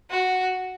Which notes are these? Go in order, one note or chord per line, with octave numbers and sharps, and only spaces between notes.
F#4